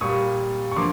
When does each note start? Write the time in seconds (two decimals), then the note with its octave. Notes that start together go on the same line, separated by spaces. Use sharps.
0.01 A#2 G3 A#3 C#6 D#6
0.71 C#6
0.76 D3 F3 A#3 C6 D6